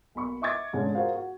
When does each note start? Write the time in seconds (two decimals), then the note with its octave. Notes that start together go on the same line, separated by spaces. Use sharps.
0.15 B1 A#3 B5 C#6
0.42 D#5 E5 C#6 D6 G#6 A6
0.73 F2 G#2 D3 G#3 C#4
0.95 F4 F#4 G#4 A#4 C5 F5
1.15 F#4